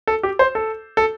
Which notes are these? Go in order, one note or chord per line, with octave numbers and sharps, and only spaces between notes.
A4
G4
C5
A4
A4